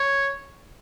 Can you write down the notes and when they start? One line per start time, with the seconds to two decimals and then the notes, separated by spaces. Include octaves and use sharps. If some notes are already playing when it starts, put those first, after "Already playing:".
Already playing: C#5